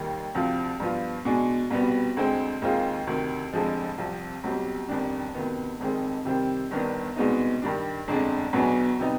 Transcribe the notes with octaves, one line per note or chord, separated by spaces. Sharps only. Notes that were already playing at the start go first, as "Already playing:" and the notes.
Already playing: D#2 D#3 G3
D2 C3 F3 C4 F4
G2 F3 B3 F4
B2 G#3 D4 G#4
C2 B2 G3 B3
D2 D3 G#3 C4
D#2 D#3 G#3 C4 F4
D2 C3 D#3
F1 F2 D3 F3 G#3
C2 C3 F3
B1 B2 G3 C4 G4
G1 F2 D#3 G3 D4
D2 C3 D#3 B3
F1 F2 D#3 G#3 C4
C3 D#3 G3 C4
G1 G2 D#3 B3 D4
C2 B2 G#3 B3 D#4
G2 D#3 G3 D4
G1 F2 D3 G#3 D4
B1 B2 B3 D4 G#4
C3 G3 B3 D#4